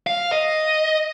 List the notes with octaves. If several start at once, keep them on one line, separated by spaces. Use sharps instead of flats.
F5
D#5